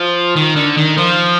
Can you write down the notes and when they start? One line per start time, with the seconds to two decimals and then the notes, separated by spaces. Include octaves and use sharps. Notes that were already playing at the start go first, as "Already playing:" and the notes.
Already playing: F3
0.36 D#3
0.56 D3
0.77 D#3
0.97 F3